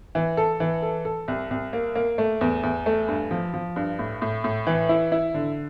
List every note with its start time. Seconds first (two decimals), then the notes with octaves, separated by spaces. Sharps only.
0.15 E3
0.37 A4
0.60 E3
0.82 A4
1.05 A4
1.28 C2
1.51 C2
1.73 A#3
1.95 A#3
2.18 A3
2.41 E2
2.63 E2
2.86 A3
3.08 G2
3.31 F3
3.54 F3
3.76 G2
3.99 A2
4.22 A2
4.44 A2
4.67 E3
4.89 E4
5.12 E4
5.34 D3